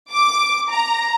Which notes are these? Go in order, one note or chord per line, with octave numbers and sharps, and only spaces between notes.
D6
A#5